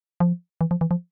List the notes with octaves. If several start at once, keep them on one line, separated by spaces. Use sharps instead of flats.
F3
E3
F3
E3
F3